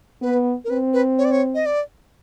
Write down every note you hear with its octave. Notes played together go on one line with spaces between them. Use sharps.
B3 B4
A#4
C4 B4
B4
C#5
D5
C#5
D#5
D5